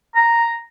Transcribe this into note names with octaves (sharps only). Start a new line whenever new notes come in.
A#5